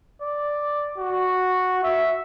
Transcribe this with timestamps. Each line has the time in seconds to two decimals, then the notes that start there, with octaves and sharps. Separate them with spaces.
0.22 D5
0.98 F#4
1.83 E5